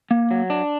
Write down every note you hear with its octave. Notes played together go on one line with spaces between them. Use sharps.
A#3
F#3
D4